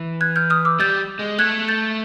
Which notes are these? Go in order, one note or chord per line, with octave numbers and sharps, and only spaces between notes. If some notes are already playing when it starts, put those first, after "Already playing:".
Already playing: E3
F#6 G#6
F6 G6
D#6 F6
D6 E6
G3 G6 A6
G#3
A3 F#6 G#6
G6 A6